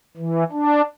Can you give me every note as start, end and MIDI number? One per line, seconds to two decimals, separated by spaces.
0.17 0.44 52
0.52 0.82 62